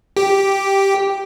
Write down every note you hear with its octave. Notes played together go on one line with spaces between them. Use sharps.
G4